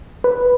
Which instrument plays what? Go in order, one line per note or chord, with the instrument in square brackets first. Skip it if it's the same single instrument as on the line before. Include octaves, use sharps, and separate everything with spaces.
[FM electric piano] B4